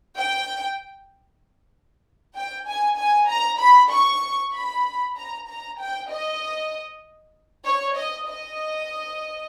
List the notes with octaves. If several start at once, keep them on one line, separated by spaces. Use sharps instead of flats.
G5
G5
G#5
G#5
A#5
B5
C#6
B5
A#5
A#5
G5
D#5
C#5
D#5
D#5